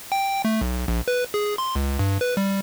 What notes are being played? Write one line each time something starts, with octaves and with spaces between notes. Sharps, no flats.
G5
A3
B1
A#1
B4
G#4
C6
C#2
G2
B4
G3